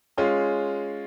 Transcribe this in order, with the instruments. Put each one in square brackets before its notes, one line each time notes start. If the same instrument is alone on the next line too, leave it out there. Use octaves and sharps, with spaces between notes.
[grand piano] G#3 C#4 F4 G#4